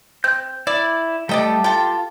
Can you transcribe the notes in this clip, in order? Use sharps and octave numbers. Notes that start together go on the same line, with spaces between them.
C4 G6
E4 D5
G3 A3 G4 D5 D#5 G5 A5
F4 A4 G5